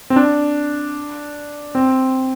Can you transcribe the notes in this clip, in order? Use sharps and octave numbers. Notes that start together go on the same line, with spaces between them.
C4
D4
C4